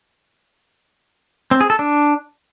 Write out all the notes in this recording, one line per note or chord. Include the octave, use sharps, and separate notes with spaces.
C4
G#4
A4
D4